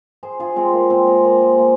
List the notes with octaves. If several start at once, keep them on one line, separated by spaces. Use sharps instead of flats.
G#4 C5
F4 G#4
G#3 C4
A#3
G#3 C4
G#3 C4
A#3
G#3
A#3